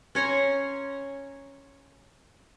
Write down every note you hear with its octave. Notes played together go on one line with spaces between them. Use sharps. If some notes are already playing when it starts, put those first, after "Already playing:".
C#4 C#5 A#5 C6